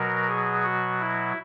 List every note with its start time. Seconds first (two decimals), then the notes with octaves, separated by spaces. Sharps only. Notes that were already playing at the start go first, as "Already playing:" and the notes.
Already playing: B2 F#3 A#4
0.28 G#4
0.63 F#4
1.00 E4